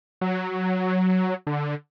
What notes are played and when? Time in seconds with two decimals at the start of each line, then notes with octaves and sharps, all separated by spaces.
0.21 F#3
1.47 D3